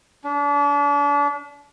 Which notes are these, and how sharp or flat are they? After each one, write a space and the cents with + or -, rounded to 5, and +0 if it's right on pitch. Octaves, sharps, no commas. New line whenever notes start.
D4 -35